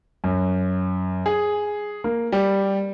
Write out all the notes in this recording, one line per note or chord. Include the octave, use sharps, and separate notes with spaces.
F#2
G#4
A#3
G3